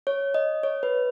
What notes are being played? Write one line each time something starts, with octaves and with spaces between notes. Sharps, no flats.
C#5
D#5
C#5
B4